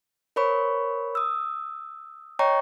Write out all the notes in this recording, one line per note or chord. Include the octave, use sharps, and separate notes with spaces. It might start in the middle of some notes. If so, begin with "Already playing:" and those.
A#4 C5 C#5 B5 C#6
D#6 E6
C#5 D#5 G5 A#5 C#6